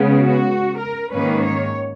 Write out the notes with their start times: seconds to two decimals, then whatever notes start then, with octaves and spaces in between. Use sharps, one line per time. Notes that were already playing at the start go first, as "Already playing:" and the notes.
Already playing: C#3 G#3 B3
0.17 F#4
0.79 A#4
1.11 G#2 D#3 A#3 C#4 B4
1.43 C#5